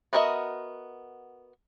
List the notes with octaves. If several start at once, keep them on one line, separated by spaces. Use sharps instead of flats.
B3 F#4 A#4 D#5 E5